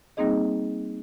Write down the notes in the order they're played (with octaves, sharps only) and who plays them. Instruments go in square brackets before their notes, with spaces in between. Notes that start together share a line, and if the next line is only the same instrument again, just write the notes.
[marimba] G3 A#3 C4 D#4 G#4 D#5